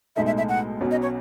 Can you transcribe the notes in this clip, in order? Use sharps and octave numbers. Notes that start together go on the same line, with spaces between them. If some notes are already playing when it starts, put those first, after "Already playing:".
B1 A2 G#3 D#4 A4 E5
E5
E5
F#5
B1 B2 F#3 C#4
D#5
C#5